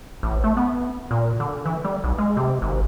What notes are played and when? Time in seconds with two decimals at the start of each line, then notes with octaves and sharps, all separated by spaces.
0.23 A1
0.44 A3
0.57 B3
1.11 A#2
1.40 D3
1.66 E3
1.84 G3
2.04 B1
2.18 G#3
2.37 C3
2.62 G#1